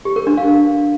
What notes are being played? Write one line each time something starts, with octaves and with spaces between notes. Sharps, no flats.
G4
A#4
D4
F5